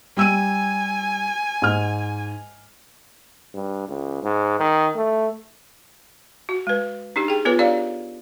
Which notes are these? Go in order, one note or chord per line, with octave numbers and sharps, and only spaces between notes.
G3 G#5 E6 D#7
G#2 F6
G2
C#2
G#2
D#3
A3
F#4
G#3 B4
D4 D#4 G4
G#4 G5
B3 F4 A4 B4 C#5
D4 G4 C#5 D5 F5